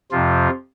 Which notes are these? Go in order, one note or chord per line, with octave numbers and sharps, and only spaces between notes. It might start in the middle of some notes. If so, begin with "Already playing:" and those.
F2 C3 F3 F4